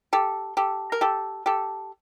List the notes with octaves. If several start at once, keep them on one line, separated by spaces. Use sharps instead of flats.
G4 A4
G4 A4
A#4
G4 A4
G4 A4